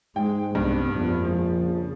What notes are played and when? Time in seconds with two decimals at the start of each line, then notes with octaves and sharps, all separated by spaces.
0.16 G#2 G#3 G5
0.55 C2 G2 B2
0.95 A#1 F2 B3
1.25 F3 G#3
1.58 C#3